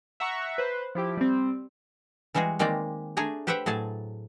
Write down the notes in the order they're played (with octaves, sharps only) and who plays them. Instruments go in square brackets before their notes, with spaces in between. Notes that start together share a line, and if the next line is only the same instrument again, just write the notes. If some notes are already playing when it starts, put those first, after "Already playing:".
[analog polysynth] E5 F#5 A#5 C#6
B4 C5
F3 E4 G4
G3 C4
[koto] E3 G3 G#3 F#4 G#4
D#3 G#3 A#3 C4 D5
A3 D4 G#4 G#5 A#5
G4 B4 C5 E5 F#5 G5
A2 F#3 G#4 A5